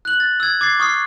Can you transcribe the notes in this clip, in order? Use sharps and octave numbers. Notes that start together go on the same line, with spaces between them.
F#6 F#7
A6
E6 G#6
D6 G#6 A6 C7
C#6 D#6 F6 C7